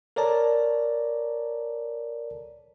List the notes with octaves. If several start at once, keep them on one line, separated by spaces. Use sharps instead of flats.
A4 A#4 C#5 D5 A5 A#5